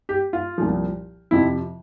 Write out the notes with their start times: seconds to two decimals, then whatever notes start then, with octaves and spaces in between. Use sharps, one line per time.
0.09 G4
0.33 F4
0.58 C2 A#2 F3
1.31 F2 C3 F3 E4